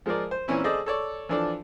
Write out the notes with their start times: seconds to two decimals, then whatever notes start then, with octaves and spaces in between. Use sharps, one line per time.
0.06 F3 G#3 F4 A#4 D5
0.31 C5
0.48 A#2 E3 C4 C#4 E4
0.64 G#4 A4 C5 D5 D#5
0.86 A4 C#5 D5
1.29 E3 F3 D4 A4 D5